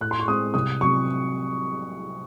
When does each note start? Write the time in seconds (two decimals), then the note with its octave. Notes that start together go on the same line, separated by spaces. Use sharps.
0.01 A2 F#6
0.11 C6
0.20 C#6
0.28 G#3 C4 D#6
0.54 C2 D#6
0.81 C3 F#3 C#6